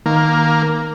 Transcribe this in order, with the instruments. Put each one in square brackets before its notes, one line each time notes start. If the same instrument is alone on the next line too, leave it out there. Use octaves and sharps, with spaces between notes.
[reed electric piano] D#3 [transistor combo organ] A#3